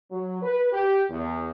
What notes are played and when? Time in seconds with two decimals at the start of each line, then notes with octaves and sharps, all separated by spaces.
0.11 F#3
0.42 B4
0.72 G4
1.09 E2